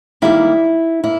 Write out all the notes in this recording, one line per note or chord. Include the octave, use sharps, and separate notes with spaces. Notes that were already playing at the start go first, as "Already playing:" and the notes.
D#3 G3 A#3 E4
A#3 E4